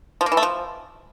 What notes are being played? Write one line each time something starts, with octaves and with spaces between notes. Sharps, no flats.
F3
A#3
E3
A3
F3